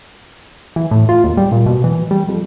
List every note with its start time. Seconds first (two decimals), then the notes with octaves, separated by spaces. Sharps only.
0.76 E3
0.91 A2
1.09 F4
1.24 D#2
1.37 G3
1.52 A#2
1.66 B2
1.84 E3
2.11 G3
2.28 F2